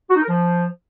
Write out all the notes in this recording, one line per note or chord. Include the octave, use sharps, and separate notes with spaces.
F#4
D#4
A#4
F3